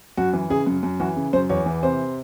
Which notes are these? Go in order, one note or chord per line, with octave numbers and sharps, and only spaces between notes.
F#2 F#4
E3
C#3 G#4
F#2
F#2
E3 F#4
C#3
F#2 C5
E2 C#5
E3
C3 C5